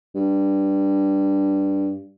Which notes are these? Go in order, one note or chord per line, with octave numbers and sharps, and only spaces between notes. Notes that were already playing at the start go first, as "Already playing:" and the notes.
G2